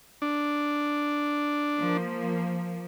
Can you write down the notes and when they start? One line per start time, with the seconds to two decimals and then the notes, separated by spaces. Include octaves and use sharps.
0.22 D4
1.75 F3 A#3